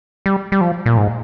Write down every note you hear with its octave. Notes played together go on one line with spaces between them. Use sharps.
G3
G3
F3
A#2
G#2